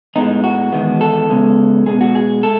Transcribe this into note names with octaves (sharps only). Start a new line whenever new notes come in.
A2 G#3 B3 D#4
F#4
E2 D#3 G#3 B3
A4
C#3 G#3 B3
B2 G#3 B3 G#4
F#4
G#4
G#3 A4